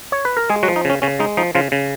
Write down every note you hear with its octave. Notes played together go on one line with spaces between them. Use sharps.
C#5
B4
A#4
G#3 G#4
F#3 F#4
F3
D#4
C#3 C#4
C#3 C#4
G#3 D#4
F3 D#4
C#3 F3 F4
C#3